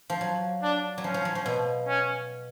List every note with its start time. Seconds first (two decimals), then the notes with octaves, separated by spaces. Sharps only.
0.10 F3
0.21 F#3
0.63 D4
0.98 F#3
1.04 F3 C#4
1.14 F3
1.25 F#3
1.35 F3
1.46 B2
1.88 C#4